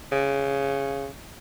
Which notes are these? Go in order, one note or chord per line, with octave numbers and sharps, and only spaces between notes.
C#3